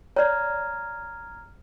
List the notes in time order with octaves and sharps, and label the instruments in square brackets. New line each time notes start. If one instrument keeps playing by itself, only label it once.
[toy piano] C#5 D5 [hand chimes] A#5 F6 G#6